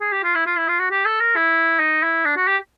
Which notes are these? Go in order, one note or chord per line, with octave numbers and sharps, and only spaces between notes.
G#4
G4
F4
E4
F4
E4
F4
F#4
G4
A4
A#4
E4
D#4
E4
D4
F#4
G4